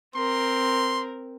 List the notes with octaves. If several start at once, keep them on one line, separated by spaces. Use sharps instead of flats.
C4 A#4 C6